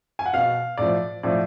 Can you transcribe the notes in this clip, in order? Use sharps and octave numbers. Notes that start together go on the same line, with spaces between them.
G#5
F#5
B2 F5
A2 F3 D5
A2 F3 D5